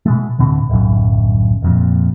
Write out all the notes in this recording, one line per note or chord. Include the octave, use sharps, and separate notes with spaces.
B2 G#3 A3
D1 B2 D3 C4
D1 B1 F#2
F1 F2 A#2